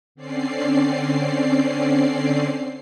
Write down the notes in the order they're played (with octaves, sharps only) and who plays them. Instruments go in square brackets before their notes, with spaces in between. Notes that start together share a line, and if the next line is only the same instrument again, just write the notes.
[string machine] D3 C4 C#4 D5 C7